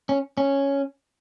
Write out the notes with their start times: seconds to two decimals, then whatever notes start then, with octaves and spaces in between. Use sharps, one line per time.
0.09 C#4
0.38 C#4